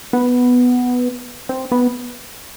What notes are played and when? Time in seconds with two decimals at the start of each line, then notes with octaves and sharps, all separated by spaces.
0.13 B3
1.49 C4
1.72 B3